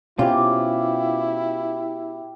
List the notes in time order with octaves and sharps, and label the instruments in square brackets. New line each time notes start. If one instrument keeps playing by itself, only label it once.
[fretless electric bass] B2 C4 C#4 [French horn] E4 [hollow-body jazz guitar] F4 [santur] G4 F5 D6